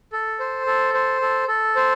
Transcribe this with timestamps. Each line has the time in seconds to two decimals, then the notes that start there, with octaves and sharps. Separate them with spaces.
0.13 A4
0.40 C5
0.66 A4
0.94 C5
1.22 A4
1.48 A4
1.76 C5